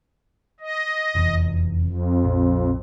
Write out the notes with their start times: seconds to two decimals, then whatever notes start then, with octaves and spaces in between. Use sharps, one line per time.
0.60 D#5
1.15 F1 E2
1.81 F2
2.24 A#1